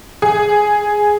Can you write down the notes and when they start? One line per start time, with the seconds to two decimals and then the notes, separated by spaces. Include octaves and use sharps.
0.22 G#4